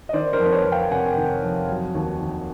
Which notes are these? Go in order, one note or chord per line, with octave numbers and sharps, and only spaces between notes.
D#5
D#3 C5 D5
A#4 C5
F2
B4 C#5
F2
F5 G5
C3 F#5 G#5
D#3
F2
F#3
D#2
D#2